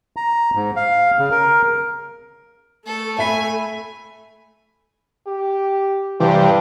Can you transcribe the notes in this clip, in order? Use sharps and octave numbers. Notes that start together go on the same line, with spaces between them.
A#5
G#2
F5
C#3
A#4
A3 A4
E5 G#5 B5 B6
G4
G2 C3 E3 G3 G4